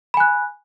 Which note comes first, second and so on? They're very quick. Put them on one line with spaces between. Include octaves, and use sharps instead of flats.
B5 G#5 F#6